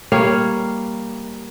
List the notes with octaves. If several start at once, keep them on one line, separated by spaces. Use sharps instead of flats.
G3 A#3 C#5 F5